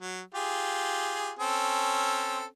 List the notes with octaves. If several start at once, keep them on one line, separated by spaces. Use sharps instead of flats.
F#3
F4 G4 G#4
C4 C#4 A4